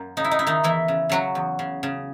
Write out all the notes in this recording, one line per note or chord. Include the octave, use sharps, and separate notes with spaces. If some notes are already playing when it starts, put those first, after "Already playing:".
Already playing: F#2 A#3
C#3 D#4
E4
D#4
C#3 E4
D#3 D#4
E2 E3 E4
C#3
C#3 F#3 F#4
E2
C#3
C#3